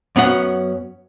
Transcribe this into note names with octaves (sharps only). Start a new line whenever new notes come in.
F#2 B3 C#4 F#4 F#5